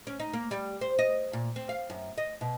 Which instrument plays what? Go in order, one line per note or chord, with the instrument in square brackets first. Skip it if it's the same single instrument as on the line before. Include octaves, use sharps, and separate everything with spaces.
[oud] C#4
D#4
A#3
G3
C5
D#5
A#2
C4
F5
F#2
D#5
B2